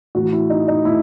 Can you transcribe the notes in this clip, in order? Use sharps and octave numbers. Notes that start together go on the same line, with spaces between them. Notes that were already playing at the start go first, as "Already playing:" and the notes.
A2 E3 F#4
E4
D#4
D#4
A2 E4